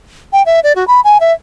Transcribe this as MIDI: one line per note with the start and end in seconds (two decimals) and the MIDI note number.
0.33 0.43 79
0.46 0.60 76
0.63 0.73 74
0.76 0.87 66
0.88 1.01 83
1.04 1.18 80
1.20 1.32 76